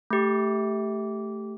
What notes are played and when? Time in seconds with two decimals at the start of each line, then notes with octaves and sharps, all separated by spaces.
0.10 A3 G4